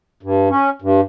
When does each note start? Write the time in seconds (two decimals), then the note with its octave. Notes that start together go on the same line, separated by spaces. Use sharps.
0.23 G2
0.50 C#4
0.82 G2